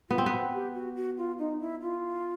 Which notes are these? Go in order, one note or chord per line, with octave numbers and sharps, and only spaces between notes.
B3 F4
C4
B3 F#4
G4
F#4
F#4
F4
D#4
E4
F4